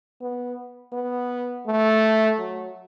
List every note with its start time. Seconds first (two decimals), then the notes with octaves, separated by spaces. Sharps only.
0.21 B3
0.93 B3
1.67 A3
2.39 F#3